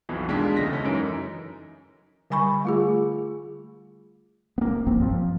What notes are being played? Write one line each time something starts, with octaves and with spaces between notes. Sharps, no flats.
B1 F2 B2 E3
D#2 G#3 D4 F4 B6
D2 C#3 G#3 D#5 A#6 B6
C#4 A4
F#2 E3 D#4 D7
D3 G3 G#5 B5 C#6
A3 F4 G#4
A#3 B3
A#1 G2 F3 C4
F3